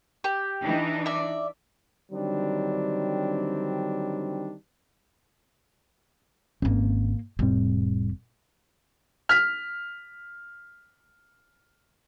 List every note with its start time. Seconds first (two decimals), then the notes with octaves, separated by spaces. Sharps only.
0.24 G4
0.62 E3 D4 D#4
1.06 D5 E5
2.12 D3 D#3 F#3 G3 C4 D4
6.62 G#1 G#2 A#3 C4 C#4
7.39 F1 A2 G3 C4
9.29 F6 B6